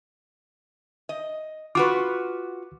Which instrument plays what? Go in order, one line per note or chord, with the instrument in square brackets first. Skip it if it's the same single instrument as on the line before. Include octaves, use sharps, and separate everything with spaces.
[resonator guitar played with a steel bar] D#5
[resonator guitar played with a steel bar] F4 F#4 B4 [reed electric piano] D6